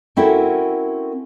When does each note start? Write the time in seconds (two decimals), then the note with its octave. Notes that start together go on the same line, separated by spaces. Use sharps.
0.16 C4 C#4 E4 F#4 A4 A#4